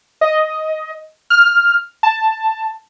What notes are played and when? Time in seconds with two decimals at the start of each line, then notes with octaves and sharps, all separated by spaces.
0.21 D#5
1.30 F6
2.03 A5